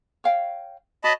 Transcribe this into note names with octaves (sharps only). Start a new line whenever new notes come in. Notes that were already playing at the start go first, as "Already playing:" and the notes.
C#5 F5 G5
F#4 C#5 D#5 A5 B5